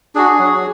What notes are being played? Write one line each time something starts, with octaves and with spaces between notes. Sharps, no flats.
D4 F#4 G#4
F#3